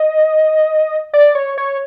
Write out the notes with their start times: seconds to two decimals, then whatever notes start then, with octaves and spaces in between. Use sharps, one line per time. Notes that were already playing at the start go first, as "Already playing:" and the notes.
Already playing: D#5
1.13 D5
1.35 C#5
1.58 C#5